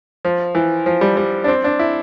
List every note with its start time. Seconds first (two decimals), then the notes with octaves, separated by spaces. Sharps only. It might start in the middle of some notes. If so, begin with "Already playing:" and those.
0.25 F3
0.55 E3
0.86 F3
1.01 G3
1.17 G3
1.44 D4
1.48 C4
1.64 D4
1.79 E4